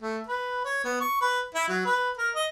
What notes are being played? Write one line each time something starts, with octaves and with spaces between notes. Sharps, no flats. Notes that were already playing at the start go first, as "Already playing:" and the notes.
A3
B4
C#5
B3
C#6
B4
E4
F#3
B4
A#4
D#5